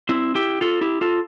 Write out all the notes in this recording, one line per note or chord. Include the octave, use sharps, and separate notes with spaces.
C4 E4
E4 G4
F4 A4
E4 G4
F4 A4